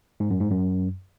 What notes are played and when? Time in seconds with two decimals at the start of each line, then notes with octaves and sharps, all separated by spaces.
0.20 G#2
0.30 F#2
0.41 G#2
0.51 F#2